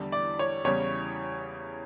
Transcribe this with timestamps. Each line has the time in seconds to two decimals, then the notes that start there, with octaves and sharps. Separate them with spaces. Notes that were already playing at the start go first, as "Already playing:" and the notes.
Already playing: E2 D3 G3
0.12 D5
0.39 C#5
0.65 E2 C#3 G3 C#5